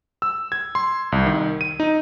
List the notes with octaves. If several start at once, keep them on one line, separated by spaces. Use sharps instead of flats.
E6
G#6
C6
C2
D#3
D#7
D#4